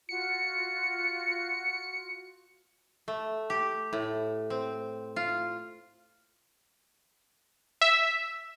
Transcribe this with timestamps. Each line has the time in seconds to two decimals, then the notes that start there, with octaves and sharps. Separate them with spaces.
0.09 F4 F#4 C#7
3.08 A3
3.50 G4
3.93 A2
4.50 C4
5.16 F4
7.81 E5